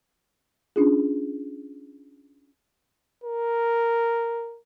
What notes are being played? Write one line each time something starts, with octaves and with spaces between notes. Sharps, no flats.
C#4 D4 F4 G#4
A#4